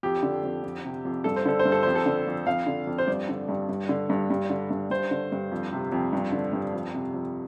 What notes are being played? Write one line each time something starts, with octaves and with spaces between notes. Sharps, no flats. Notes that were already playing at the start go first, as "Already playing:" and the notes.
F2 G4
D3
F2
F2
C3
F2
G2 A4
C5
D3 A4
C5
G2
A4
F2 C5
A4
D3
F2
F2 F5
D3
F2
C5
G2 D5
D3
G2
G2
D3
G2
G2
D3
G2
G2 C5
D3
G2
F2
C3
F2
G2
D3
G2
F2
C3
F2